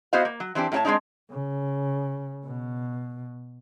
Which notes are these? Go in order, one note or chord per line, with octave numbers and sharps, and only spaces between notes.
B3 E4 F#4 C5 D#5 F5
A#3
F#3
E3 C4 D4 G4
A2 G3 E4 C#5 A5
G#3 A3 C4 D4 D#4
C#3
B2